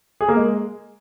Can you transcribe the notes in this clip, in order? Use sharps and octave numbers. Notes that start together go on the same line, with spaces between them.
G#4
A#3
G#3